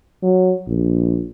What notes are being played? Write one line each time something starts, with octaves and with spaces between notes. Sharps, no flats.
F#3
A#1